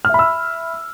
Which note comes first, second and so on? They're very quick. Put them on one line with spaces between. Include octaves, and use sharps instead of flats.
F6 E5 B5 E6